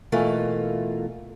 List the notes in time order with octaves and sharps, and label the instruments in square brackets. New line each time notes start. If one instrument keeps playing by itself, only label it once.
[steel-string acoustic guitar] B2 E3 A3 A#3 F4